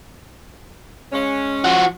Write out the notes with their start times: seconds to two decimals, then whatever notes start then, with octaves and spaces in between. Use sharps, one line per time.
1.13 G#3 C#4
1.64 F3 F#4